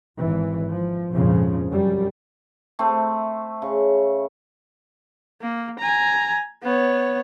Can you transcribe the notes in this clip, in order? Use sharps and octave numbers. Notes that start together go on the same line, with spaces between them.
G#1 E3
F3
A#1 F2 G#2 C#3 F3
F#2 G3
A3 C4 E4
C#3
A#3
G#5 A#5
B3 C#5